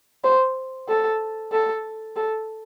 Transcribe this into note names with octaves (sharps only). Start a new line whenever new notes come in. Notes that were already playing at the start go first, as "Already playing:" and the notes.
C5
A4
A4
A4